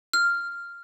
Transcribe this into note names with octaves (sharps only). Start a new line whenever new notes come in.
F6